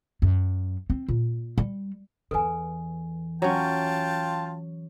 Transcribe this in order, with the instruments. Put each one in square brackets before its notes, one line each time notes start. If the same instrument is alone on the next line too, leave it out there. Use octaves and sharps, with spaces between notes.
[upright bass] F#2
C4
A#2
G3
[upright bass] E2 E3 [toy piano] A4 B4 G#5
[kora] F#3 C#4 [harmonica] F4 G5 A5